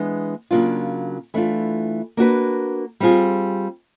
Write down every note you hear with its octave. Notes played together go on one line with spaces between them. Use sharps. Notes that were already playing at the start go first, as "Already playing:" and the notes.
Already playing: E3 G#3 B3 D4
C#3 F#3 A#3 D4 F4
E3 A3 D4 F4
A#3 D4 F#4 B4
G3 C4 F4 G#4